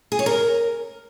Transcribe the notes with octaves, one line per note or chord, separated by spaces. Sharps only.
G#4
C#5
A#4